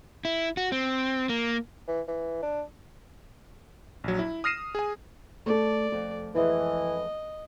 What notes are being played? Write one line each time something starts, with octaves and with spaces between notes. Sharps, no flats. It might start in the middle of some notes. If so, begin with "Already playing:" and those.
E4
F#4
C4
A#3
E3
E3
D4
A#1 F#3
E4
D#6 F6 A#6 C7 D#7 E7
G#4 G#5
A3 A4 D5
F2
F2 E3 G#3 D#5